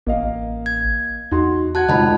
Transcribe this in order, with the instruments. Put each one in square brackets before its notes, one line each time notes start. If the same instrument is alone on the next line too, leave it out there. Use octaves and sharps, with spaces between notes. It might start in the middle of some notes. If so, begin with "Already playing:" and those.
[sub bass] A1 [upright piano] A#3 D#5 F5
[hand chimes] G#6
[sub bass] E2 [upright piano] D#4 F#4 C6
[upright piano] F#4 F#5 [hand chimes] A5 F#6 G#6
[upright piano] F1 C#2 [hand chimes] D#5 A5 B5